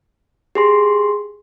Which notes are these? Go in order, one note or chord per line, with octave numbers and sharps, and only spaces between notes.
G4 G#4 C6